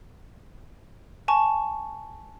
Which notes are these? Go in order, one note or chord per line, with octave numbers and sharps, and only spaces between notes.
G#5 A5 C#6